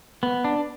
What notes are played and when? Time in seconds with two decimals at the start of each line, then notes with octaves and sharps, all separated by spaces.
0.23 B3
0.44 D4